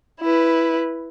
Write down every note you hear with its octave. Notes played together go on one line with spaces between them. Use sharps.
E4 B4